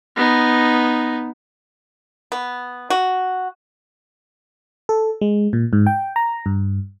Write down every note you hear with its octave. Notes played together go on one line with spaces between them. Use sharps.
B3 D#4
B3
F#4
A4
G#3
A#2
G#2
G5
A#5
G2